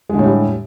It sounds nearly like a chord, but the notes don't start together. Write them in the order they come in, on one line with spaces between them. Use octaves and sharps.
G#3 D3 A2 G3